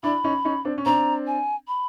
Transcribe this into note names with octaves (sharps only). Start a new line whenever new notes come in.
D4 E4 B5
C#4 D#4
C#4 D#4
C4 D4
C#4
C4 D4 A#5
G#5
B5